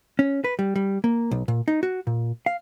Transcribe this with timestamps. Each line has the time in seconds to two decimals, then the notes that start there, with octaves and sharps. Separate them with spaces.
0.19 C#4
0.44 B4
0.59 G3
0.76 G3
1.04 A#3
1.31 B1
1.48 A#2
1.68 D#4
1.83 F#4
2.07 A#2
2.46 F5